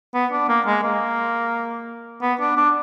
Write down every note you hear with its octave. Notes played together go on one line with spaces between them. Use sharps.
B3
D4
A#3
G#3
A#3
B3
D4
D4